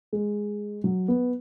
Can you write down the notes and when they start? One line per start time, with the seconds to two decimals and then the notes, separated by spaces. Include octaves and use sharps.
0.13 G#3
0.84 F#3
1.08 B3